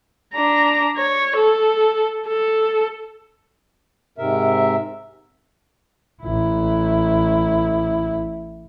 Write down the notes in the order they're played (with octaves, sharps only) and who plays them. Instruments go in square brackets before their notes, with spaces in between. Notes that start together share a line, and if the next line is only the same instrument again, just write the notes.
[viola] D4 A#5
C#5
A4
A4
[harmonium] G#2 C3 A#4 E5
[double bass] A1 E4